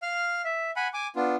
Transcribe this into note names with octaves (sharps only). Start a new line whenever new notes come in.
F5 F6
E5
F#5 G#5 B5
G#5 D6
B3 D4 F4